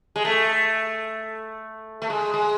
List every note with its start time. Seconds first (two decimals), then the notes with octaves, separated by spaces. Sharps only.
0.16 G#3
0.25 A3
2.02 A3
2.10 G#3
2.34 G#3